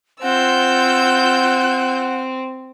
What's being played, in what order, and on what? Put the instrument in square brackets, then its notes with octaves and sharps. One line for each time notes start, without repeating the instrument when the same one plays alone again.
[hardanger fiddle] C4 [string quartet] F4 E6 G6 [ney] F#5